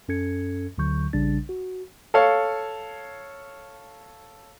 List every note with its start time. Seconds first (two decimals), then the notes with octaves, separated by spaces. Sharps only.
0.08 F#2 C#4 A4 G#6 C#7
0.78 D2 D3 F#3 C#6 G6
1.13 A#1 C#3 G3 D4 A6
1.49 F#4
2.14 A4 C#5 F5